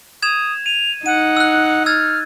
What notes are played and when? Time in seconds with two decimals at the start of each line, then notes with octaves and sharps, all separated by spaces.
0.23 D#6 G#6 E7 F7
0.66 D#7 F7
1.06 D#4 F#5 D#7
1.37 E6 F#6
1.86 E6 F6 G#6 A6